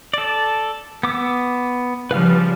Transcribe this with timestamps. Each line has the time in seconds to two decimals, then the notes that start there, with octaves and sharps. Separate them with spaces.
0.14 A4 D5
1.03 B3 D6 E6
2.11 C#3 F3 G3 B4 F5 F6